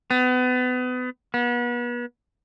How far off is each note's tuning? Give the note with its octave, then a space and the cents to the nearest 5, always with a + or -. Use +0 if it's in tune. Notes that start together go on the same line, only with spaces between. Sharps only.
B3 +30
B3 -35